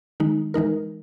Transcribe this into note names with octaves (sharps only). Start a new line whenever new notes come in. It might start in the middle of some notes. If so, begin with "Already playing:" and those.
D#3 G#3 D#4
E3 G#3 D#4 A#4